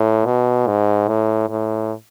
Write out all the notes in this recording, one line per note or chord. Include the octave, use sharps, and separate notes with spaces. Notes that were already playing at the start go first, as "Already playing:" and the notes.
Already playing: A2
B2
G#2
A2
A2